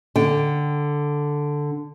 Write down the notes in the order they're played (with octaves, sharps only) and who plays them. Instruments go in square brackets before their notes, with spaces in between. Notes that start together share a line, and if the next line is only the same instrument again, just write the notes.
[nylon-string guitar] D3 G5